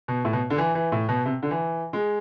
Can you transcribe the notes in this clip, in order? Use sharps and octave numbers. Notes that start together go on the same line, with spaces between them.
B2
A2
B2
D3
E3
E3
A2
B2
C3
D3
E3
G#3